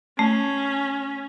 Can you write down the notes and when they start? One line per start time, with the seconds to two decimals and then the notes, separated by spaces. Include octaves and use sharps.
0.19 A3 C#4